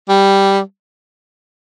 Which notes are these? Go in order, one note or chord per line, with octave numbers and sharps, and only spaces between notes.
G3